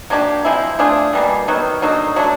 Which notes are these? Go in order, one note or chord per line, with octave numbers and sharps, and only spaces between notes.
F#3 A#3 D4 G4
F3 G#3 C4 E4
A3 D4 F4 G#4
B2 G3 A#3
D#3 F#3 B3
D3 F#3 A#3 D#4
F#3 A3 D4